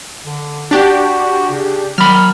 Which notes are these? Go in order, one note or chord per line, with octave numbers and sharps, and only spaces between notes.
D3
D4 F#4 G4
C#3
D#3 F#3 B5 F6